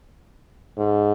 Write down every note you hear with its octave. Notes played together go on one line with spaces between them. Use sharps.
G#2